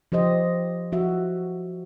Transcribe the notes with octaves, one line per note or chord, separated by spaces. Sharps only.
F3 G4 C5 D#5
F3 F#4 E5